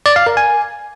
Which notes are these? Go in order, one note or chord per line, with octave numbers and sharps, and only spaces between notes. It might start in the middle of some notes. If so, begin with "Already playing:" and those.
D5
F5
A#4
G#5